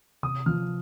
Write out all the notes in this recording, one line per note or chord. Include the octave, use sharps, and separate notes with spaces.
C3 D#6
F3 F6